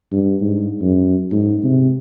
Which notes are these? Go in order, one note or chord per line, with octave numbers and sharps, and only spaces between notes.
G2
G#2
F#2
G#2
C3